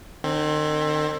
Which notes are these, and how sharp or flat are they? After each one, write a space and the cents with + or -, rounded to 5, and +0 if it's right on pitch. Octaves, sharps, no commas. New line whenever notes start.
D#3 -40 C4 +25